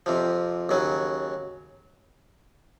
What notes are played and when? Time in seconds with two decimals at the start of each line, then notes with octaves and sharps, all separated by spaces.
0.06 F2 C3 F3
0.69 D#2 C#3 F#3